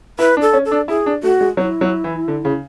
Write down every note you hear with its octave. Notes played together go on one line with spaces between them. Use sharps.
E4 B4
D4
A4
C#4
A4
D4
E4 G#4
D4
A3 F#4
G#3
F#3 E4
F#3
E3
D3
C#3